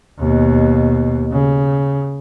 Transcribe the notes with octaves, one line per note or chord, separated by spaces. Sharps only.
D#2 B2
C#3